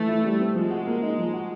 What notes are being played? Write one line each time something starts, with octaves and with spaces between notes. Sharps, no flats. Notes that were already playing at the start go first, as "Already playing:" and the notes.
Already playing: E3 A3
E4
G3
C4
F3 G#3
F#4
A#3
D#4
F3
F#4